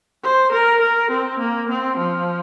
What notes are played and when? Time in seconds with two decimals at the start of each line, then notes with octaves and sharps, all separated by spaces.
0.23 C5
0.52 A#4
0.82 A#4
1.11 C4
1.40 A#3
1.70 C4
1.98 F3